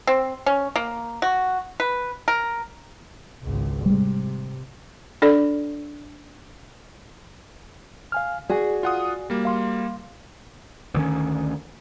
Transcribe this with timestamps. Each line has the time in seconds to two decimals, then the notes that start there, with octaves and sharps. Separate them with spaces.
0.07 C4
0.46 C#4
0.76 A#3
1.22 F#4
1.80 B4
2.28 A#4
3.43 G#1 C#2
3.86 C3 G3 G#3
5.22 D4 A4 D5
8.12 F5 G#5 F6
8.49 F#4 G#4 D5 G#5
8.83 F4 F#5 D#6
9.30 G3 A#3
9.45 F5 C6
10.94 D2 D#3 C#4